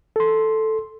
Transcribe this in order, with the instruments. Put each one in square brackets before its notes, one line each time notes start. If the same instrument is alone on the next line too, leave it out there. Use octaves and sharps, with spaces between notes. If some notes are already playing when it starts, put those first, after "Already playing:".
[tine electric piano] A4 C6